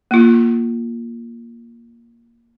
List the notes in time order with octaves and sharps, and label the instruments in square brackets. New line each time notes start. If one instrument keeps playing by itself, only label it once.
[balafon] A#3 F4